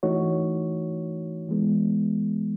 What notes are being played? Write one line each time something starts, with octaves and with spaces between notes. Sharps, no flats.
E3 A3 D#4 F#4 C#5
E3 G#3 B3